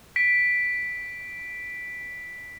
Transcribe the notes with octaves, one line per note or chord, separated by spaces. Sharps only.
B6 D7